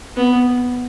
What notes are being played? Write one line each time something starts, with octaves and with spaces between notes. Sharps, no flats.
B3